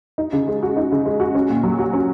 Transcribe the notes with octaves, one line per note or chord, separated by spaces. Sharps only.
D#4
C#3
G#3
F#4
D#4
C#3
G#3
F#4
C#4
A#2
F#3
F#4
C#4